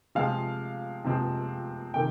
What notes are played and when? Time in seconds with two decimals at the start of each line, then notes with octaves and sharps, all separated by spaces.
0.15 C3 F3 G#3 C4 F5
1.04 C3 F3 G#3 C4
1.94 C3 D#3 G5